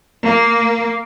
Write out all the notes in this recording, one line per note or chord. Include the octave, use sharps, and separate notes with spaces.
A#3